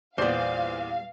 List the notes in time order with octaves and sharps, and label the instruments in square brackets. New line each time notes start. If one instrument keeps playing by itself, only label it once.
[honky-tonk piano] E2 A#2 [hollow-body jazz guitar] G3 B3 [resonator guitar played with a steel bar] C5 D5 [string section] F5